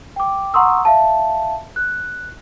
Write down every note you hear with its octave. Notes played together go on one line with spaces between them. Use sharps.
G5 D6
F#5 A#5 C6 C#6 D#6 E6
E5 F5 A5
F#6